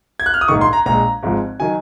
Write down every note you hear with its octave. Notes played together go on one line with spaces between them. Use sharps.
G#6
F#6
F6
D#6
A#1 G#2 D#3 C#6
C6
A#5
A#1 A#2 G#3 A#5
G#1 G#2 F3 G#3
D#3 F#3 G#5